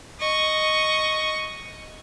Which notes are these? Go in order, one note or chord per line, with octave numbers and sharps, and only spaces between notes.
D#5 C#6